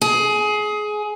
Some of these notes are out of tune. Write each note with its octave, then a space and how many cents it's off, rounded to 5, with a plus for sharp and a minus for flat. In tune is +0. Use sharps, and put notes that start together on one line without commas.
G#4 +20